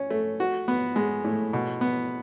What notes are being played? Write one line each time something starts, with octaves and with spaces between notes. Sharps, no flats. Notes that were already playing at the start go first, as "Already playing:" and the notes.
Already playing: C#4
A3
F#4
B3
G#3
A2
B2
B3